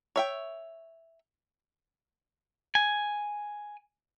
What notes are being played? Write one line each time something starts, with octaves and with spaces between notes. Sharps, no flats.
C#5 E5 G5
G#5